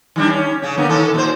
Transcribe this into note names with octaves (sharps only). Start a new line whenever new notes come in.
D#3 G3 D4
C#4
C#3 C#4
D3 A#3 B3
D#3 C#4 A4
A#2 C5